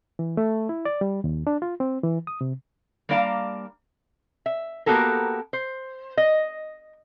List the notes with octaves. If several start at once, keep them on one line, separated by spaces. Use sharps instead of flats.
E3
A3
E4
D5
G3
D#2
D4
F4
C4
E3
D#6
C3
G3 A#3 D4 D5 F5 A#5
E5
A#3 B3 F#4 G4 A4 A#4
C5
D#5